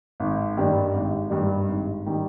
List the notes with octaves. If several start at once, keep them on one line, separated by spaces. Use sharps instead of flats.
G#1
G2 D#3 G3 D4
G#1
G2 D#3 G3 D4
G#1
D#3 G3 D4